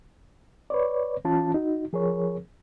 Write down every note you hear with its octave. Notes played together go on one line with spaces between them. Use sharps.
B4 C#5 D5
E3 C#4 F4 A5
D#4 F#4
F3 G#4 A#4 C#5